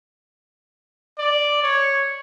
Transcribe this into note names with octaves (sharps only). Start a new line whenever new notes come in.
D5
C#5